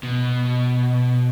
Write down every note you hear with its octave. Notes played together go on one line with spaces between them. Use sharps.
B2